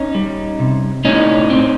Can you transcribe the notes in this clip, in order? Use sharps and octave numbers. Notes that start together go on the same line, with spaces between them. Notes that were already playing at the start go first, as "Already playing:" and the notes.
Already playing: C#4 D#4
G3
C3
A2 C#4 D#4
C4